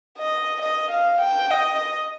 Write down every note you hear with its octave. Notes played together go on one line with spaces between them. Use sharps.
D#5
D#5
F5
G5
D#5